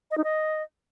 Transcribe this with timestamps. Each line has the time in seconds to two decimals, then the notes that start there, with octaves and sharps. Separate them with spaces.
0.11 D#5
0.18 D#4
0.24 D#5